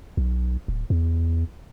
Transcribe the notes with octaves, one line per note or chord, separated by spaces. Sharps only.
B1
D1
E2